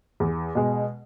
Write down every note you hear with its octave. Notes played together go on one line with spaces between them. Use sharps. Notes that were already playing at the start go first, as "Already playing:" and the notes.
E2
B2 G#3